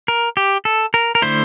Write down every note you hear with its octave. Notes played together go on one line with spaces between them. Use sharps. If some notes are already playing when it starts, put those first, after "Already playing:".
A#4
G4
A4
A#4
A#4
D3 A3 E4 C5